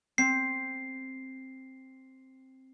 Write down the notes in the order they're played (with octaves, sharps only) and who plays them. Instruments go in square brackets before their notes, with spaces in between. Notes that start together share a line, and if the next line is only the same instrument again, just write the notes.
[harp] C4 [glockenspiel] C7